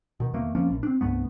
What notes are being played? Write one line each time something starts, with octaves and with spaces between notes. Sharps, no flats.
B2 D#3
E2 D#3 A3 A#3
F2 F3 A#3 C#4
A#1
C4 D4
C2 G2 A3 B3